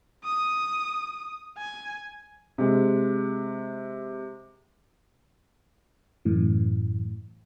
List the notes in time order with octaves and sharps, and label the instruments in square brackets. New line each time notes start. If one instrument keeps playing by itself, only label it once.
[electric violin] D#6
G#5
[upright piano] C3 G#3
[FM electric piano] F#2 A2 E3